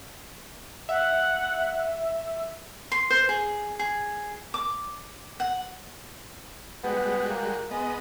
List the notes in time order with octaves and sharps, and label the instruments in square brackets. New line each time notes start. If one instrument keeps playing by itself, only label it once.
[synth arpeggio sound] E5 [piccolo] F#5
[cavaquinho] C6
C5
G#4
G#4
D6
F#5
[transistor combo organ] G3 G#3 F#4 [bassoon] B3
[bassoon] A#3
[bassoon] G#3 [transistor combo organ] B3 D#5